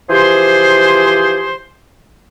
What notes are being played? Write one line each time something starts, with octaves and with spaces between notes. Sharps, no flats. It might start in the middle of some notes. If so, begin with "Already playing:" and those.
E3 F3 G4 G#4 C5